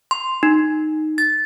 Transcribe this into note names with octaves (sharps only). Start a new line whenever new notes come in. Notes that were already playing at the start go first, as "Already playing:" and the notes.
C6
D#4
A6